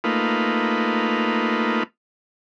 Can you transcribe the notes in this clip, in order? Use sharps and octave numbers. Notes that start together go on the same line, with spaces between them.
A3 A#3 D#4 F4 B4